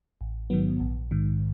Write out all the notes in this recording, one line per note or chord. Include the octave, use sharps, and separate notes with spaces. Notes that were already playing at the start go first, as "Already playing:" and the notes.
A1
G#2 D#3 F#3 B3
A#1
G#2 D#3